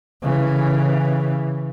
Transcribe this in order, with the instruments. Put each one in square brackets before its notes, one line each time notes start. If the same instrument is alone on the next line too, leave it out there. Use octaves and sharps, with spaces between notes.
[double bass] C#3 E3